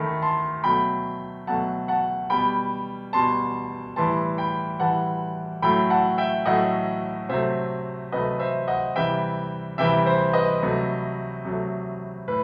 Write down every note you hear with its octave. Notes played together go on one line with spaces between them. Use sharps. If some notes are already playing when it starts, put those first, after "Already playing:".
Already playing: D#3 A3 B5
A5 C6
B2 F#3 A3 G5 B5
B2 F#3 A3 F#5 A5
F#5 A5
B2 G3 G5 B5
B2 G3 A5 C6
A2 E3 G3 A5 C6
G5 B5
A2 E3 G3 F#5 A5
A2 F#3 A3 G5 B5
F#5 A5
E5 G5
A2 F#3 A3 D#5 F#5
C3 F#3 A3 C5 E5
C3 F#3 A3 B4 D#5
C5 E5
D#5 F#5
C3 E3 G3 E5 G5
C3 E3 G3 E5 G5
C5
B4 D#5
C3 F#3 A3
C3 F#3 A3
A2 B4